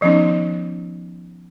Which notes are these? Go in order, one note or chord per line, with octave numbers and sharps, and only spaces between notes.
D#3 F3 B3 C#4 D#4